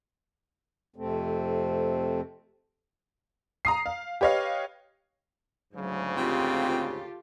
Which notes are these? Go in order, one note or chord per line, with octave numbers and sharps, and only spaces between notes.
F2 C3 A3 C4
A#5 D#6 C7
F5
G4 B4 C#5 D#5 F5
D2 G#2 C#3 F#3
C4 F4 G4 A4